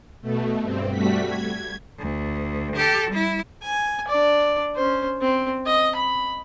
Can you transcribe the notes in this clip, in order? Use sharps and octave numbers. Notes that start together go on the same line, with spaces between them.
B2 A3
G2 C4
G3 A3 F#4 B6
G#6
D2
G4 A4
G3 E4
G#5
D4 D5
C#4 C5
C4
D#5
B5